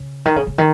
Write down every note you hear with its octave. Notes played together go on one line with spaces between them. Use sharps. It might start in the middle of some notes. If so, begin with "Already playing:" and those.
Already playing: C#3
D#3
C#3
C#3
D#3